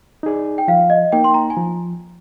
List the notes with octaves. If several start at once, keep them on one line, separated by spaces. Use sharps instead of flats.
D#4 G#4 D5
G5
F3 F5
D#5
A#3 D#4 G5
C6
A#5
G#5
F3 A#5